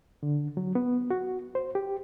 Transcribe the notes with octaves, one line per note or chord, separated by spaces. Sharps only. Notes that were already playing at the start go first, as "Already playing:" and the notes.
D3
F#3
B3
F#4
C5
G4